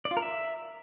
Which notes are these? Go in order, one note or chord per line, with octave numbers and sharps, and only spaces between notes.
D5
F4
A#4
E5